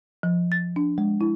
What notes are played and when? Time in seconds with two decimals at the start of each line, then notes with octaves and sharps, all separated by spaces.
0.23 F3
0.52 A6
0.76 D4
0.98 G#3
1.21 E4